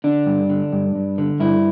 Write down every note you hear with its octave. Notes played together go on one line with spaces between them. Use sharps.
D3 D4
G2
D3
G2
G2
D3
G2 E4